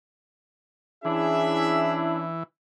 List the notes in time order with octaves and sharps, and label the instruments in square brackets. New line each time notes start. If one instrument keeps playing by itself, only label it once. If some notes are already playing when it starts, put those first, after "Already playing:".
[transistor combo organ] E3 [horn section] C#4 D4 E4 [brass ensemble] G#4 E5